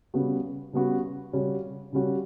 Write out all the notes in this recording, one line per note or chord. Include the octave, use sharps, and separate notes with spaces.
C#3 G3 B3 F#4
C#3 G3 B3 F#4
C#3 G3 C#4 F#4
C#3 G3 C#4 F#4